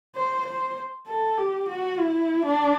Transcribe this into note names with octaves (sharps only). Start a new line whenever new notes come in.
C5
C5
A4
G4
F#4
E4
D4